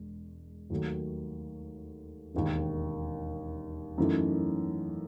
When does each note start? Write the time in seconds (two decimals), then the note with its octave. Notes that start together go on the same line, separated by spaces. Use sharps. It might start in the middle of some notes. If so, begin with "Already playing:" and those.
Already playing: E1 G#3
0.70 D#2 D#3 F#3 A3
2.34 E1 D#2 D#3
3.98 F#2 E3 A3 D#4